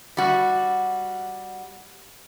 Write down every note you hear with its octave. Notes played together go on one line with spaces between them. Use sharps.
G3 F#4